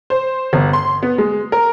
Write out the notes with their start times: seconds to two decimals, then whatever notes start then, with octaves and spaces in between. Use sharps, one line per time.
0.10 C5
0.53 G1
0.73 C6
1.03 B3
1.18 G#3
1.52 A#4